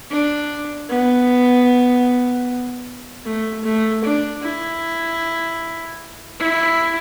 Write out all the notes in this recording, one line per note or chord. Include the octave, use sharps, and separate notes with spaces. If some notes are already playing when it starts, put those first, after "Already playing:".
D4
B3
A3
A3
D4
E4
E4